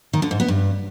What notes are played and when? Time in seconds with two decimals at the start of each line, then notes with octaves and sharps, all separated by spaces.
0.13 D#3
0.22 D3
0.31 G#2
0.40 B3
0.48 G2